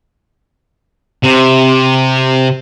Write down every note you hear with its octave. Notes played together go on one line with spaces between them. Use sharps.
C3